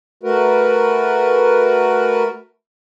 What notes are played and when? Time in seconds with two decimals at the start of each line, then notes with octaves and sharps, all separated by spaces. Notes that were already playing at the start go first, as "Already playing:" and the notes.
0.23 A3 F#4 A#4 B4